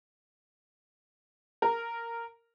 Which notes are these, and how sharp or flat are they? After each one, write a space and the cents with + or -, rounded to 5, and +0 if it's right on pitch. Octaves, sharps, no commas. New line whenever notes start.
A#4 -10